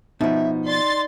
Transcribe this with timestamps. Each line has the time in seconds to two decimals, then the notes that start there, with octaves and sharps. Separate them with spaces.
0.21 B2 F3 D#4 E5
0.66 D5 C6 A6